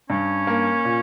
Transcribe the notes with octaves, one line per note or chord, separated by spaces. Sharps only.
G2 C#4
A#3
A#2